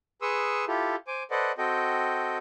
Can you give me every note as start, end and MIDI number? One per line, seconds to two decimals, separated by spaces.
0.22 0.65 68
0.22 0.65 71
0.22 0.65 84
0.22 0.65 85
0.22 0.65 87
0.22 0.65 88
0.68 0.96 64
0.68 0.96 65
0.68 0.96 67
0.68 0.96 69
1.07 1.23 72
1.07 1.23 80
1.07 1.23 86
1.31 1.52 69
1.31 1.52 71
1.31 1.52 72
1.31 1.52 74
1.31 1.52 75
1.31 1.52 78
1.58 2.38 60
1.58 2.38 66
1.58 2.38 69
1.58 2.38 75
1.58 2.38 79